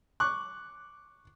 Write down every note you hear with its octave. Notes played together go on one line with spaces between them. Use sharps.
C#6 D6 F#6